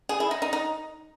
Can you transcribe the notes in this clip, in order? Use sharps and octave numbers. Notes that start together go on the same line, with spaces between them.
G#4
E4
D#4
D#4
D#4